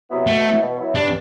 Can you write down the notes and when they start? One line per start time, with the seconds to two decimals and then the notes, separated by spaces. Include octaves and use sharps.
0.09 C3 F#3 B3 E4
0.27 B2 A3
0.43 F#3 B3 E4
0.60 B2
0.78 F#3 B3 E4
0.95 G2 D4